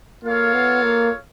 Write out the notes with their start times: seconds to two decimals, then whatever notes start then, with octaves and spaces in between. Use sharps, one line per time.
0.24 A#3 F4 A4 C#5 F5
0.54 B3
0.83 A#3